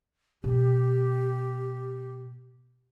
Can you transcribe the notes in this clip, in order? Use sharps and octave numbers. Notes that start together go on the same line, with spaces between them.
B2 G4